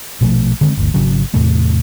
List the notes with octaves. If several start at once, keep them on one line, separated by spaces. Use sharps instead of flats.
A#1 B2 F3 A3
D3 D#3 G#3 C4
G1 D2
G#1 C#3 F#3
E2 A2 C3 A3